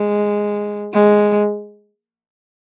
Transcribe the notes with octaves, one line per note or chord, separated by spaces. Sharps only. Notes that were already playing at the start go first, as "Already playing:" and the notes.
Already playing: G#3
G#3